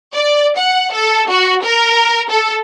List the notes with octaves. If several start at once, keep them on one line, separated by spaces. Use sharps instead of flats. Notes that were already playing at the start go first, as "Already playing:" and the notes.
D5
F#5
A4
F#4
A#4
A4